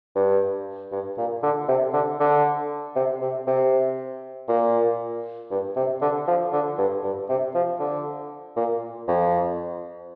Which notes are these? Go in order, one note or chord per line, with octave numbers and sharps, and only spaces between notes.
G2
G2
A#2
D3
C3
D3
D3
C3
C3
C3
A#2
G2
C3
D3
F3
D3
G2
G2
C3
F3
D3
A#2
F2